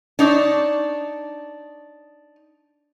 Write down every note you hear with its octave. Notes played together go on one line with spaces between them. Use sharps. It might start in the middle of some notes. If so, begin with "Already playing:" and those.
D4 D#4 C#5